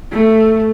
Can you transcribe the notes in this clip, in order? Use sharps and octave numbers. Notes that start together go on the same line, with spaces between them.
A3